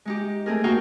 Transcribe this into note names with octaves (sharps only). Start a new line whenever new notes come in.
G#3 D#4 G4
A3 C4 G#4 A#4
A#3 D#4 F#4 A#4 F5 G5